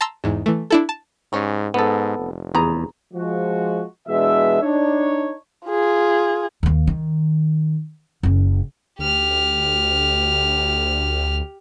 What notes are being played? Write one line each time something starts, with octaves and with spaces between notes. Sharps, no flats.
A5 A#5 C6 E6
E2 G#2
E3 A3
D4 E4 A4
A5
G#2 G3 C#4
G#2 B3 A4
F1
E2 B3 G#4 A#5
F3 G#3 F#4
B2 E3 G#3 D4 E5
D4 D#4 C#5
F4 G#4
D#2 A#3
D#3
F#1 C#4
D2 G4 F6